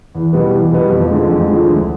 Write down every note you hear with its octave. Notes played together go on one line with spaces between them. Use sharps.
E2
B2 G3 B3
E2
B2 G3 B3
F2
D3 F3 G#3
F2
D3 F3 G#3
D2